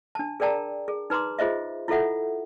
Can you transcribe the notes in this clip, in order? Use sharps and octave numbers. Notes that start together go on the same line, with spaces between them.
D4 A5
G#4 A#4 D5 G5 A5 A#5
G#4
D#4 B4 A#5 C6 D6
F4 G#4 C5 D#5 E5
E4 F4 A4 E5 F#5